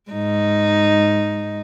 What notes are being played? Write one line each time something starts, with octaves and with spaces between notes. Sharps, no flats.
G#2 D#4